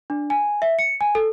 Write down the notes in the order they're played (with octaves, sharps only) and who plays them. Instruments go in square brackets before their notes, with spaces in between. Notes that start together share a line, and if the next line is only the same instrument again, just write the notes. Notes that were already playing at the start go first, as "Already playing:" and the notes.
[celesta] D4
G#5
E5
C#7
G#5
A4